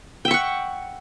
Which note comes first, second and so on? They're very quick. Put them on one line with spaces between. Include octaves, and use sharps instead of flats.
G5 E5 C#6 F#5